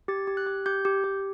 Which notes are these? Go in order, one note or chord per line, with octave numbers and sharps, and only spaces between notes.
G4 A6
G4
F#6
G4
G4 G6
G4
G4